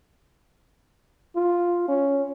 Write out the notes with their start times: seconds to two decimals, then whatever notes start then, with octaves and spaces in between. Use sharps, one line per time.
1.35 F4
1.88 C#4